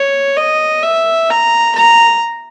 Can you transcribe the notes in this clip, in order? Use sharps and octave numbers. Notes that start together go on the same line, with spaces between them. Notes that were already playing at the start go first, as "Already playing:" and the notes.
Already playing: C#5
D#5
E5
A#5
A#5